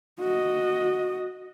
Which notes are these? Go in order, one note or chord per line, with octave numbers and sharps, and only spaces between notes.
F#4 D#5